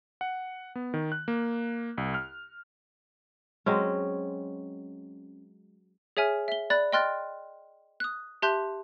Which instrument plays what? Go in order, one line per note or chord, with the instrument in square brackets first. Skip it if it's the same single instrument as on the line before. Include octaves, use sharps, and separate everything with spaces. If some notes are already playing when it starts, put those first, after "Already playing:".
[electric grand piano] F#5
B3
D#3
F#6
A#3
C2
F6
[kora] F#3 G#3 C4 C#4
[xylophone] G#4 C#5 E5 G#5 F6
E5 G7
D5 B5 F#6 A6
D#5 G5 C6 F6 F#6 A6
D#6 F#6
G4 E5 A5 C6 F#6 G6